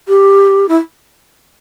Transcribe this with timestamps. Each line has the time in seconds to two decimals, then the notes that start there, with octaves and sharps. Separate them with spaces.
0.08 G4
0.69 E4